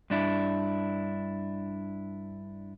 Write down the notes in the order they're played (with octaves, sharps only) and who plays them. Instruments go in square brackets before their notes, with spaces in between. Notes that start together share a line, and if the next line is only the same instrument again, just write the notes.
[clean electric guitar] G2 D4 E4